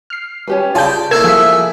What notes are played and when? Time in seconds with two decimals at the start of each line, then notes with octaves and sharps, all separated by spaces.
0.10 F6 C7
0.47 C#4 G4 B4
0.75 F4 G4 G#4 D5 A5 B5 G6
1.11 A3 A#3 E4 A#4 G#6 E7
1.24 F3 G#4 E5 B6
1.52 G#4